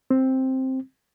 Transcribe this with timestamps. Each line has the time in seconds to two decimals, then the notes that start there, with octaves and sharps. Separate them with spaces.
0.11 C4